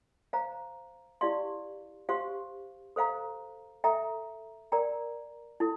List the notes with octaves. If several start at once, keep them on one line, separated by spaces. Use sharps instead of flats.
C5 F5 A#5
E4 G4 D5 F5 C6
G4 C5 F5 C6
A4 C5 F5 A#5
A4 E5 G5 A#5
A#4 D5 G5 A#5
E4 A4